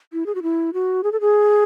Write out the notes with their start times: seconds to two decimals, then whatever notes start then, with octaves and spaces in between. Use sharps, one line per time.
0.13 E4
0.26 G#4
0.35 F#4
0.42 E4
0.74 F#4
1.03 G#4
1.12 A4
1.20 G#4